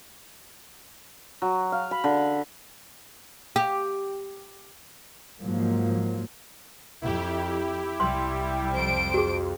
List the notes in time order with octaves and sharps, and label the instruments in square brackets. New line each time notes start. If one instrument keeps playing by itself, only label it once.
[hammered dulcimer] F#3
F5
B5
D3
[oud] G4
[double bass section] G#2 F3 F#3 A#3
[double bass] F2 [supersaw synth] E4 G4
[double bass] C2 G3 [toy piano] C6
[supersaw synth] F2 [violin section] C5 D7
[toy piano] F#4 G#4